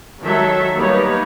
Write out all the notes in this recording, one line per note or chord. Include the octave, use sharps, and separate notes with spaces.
D#3 F#3 A4 E5
G3 A#3 B3 D#4 B4 C#5